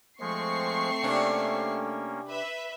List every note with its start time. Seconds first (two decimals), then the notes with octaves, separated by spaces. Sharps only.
0.21 F3 G#3 A3 C4 C#6 C7
1.03 C3 A#3 C#4 D4
2.29 B4 E5